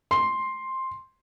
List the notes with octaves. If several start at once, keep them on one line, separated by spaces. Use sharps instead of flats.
C6